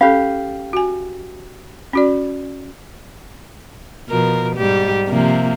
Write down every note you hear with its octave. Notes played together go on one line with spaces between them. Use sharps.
C#4 G4 A4 F5
F#4 G#5
C#4 F#4 D5
B2 F3 A#4
G#2 G3 G4
C3 F3 A#3